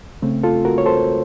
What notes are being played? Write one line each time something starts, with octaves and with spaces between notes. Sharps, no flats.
C#3 A3 C4
F4 A4
F#4 A#4
C#5
A4 C5